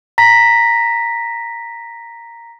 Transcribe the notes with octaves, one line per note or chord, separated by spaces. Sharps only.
A#5 A#6 B6